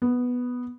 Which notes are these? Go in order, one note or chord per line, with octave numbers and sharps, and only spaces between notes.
B3